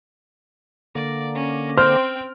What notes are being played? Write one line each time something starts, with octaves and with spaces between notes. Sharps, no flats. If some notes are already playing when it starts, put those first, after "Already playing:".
D3 A#3 D5
C#4
C4 C5 G5 F6